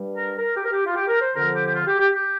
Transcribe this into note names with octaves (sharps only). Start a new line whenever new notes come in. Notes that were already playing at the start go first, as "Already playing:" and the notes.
Already playing: G2 G3
A#4
A#4
G4
A#4
G4
F4
G4
A#4
C5
F2 D3 F3 A#4
G4
G4
F4
G4
G4
G4